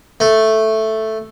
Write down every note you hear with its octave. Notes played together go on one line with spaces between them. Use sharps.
A3